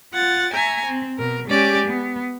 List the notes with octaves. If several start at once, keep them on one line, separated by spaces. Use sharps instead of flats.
F4 F#5 A6
E5 G#5 A#5 C#6
C4
B2 A#4
G#3 C#4 G4 D5 G#5
B3